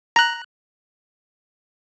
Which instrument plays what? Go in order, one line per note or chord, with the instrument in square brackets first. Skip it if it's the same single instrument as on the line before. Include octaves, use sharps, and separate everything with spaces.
[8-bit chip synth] A#5 F#6